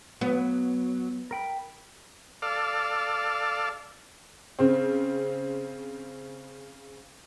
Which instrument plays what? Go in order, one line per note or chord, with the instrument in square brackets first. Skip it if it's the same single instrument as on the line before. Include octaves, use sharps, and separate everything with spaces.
[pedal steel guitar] F#3 [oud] B3
[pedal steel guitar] A#4 G5 B5
[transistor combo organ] A4 D5 F5
[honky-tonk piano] C#3 C4